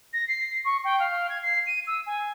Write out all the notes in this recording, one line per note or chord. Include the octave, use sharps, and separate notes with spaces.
A#6
C7
C#6
G5
F5
G#6
C7
D#7
E6
G#5